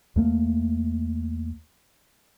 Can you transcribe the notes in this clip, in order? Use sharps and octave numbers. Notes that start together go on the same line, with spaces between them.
E2 A3 A#3